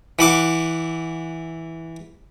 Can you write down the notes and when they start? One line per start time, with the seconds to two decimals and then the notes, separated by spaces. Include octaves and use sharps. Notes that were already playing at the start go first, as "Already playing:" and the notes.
0.19 E3 F#5 D6